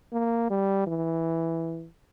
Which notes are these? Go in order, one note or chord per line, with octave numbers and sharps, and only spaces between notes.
A#3
G3
E3